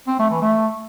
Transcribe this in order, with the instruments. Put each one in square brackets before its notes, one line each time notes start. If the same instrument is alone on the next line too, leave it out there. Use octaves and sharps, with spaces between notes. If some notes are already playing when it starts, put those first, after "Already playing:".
[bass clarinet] C4
A3
E3
A3